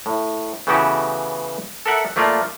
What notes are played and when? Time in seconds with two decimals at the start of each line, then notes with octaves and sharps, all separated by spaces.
0.06 A2
0.67 C#3 E3 A3 B3 F#4 G4
1.86 A4 A#4 E5 F#5
2.16 F3 A3 A#3 F4 D5